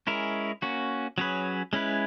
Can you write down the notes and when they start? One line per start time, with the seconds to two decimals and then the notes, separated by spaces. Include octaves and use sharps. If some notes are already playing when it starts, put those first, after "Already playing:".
0.07 G#3 C#4 E4 A#4
0.62 A#3 C#4 F#4
1.18 F#3 C#4 G#4 B4
1.73 G#3 C#4 E4 B4